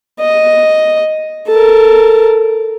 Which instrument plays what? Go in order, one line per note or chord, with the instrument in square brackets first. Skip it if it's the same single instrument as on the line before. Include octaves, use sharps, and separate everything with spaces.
[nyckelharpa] D#5
A4 A#4